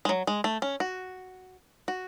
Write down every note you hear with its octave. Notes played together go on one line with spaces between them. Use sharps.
G#3
F#3
G#3
A3
C#4
F#4
F#4